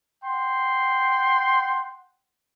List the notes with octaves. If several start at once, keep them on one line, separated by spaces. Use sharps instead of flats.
F#5 G5 C6